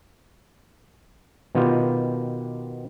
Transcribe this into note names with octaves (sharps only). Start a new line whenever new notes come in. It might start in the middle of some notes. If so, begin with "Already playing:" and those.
B2 D#3 B3 F4 G4